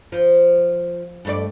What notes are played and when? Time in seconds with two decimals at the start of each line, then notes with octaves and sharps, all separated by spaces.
0.12 F3
1.25 G2 A3 D5